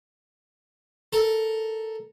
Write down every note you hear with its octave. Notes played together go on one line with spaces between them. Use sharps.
A4 A#4